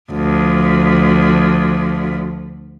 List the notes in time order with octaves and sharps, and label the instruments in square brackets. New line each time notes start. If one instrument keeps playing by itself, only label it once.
[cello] D2 F3